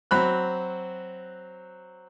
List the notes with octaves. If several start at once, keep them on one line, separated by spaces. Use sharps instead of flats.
F#3 C4 B5 F#6